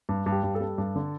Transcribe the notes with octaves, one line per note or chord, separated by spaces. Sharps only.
G2
G2
G4
G2
A4
G3
G2
D3